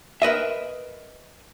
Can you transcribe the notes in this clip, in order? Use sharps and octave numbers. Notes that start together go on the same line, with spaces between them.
A#4 B4 D#5 E5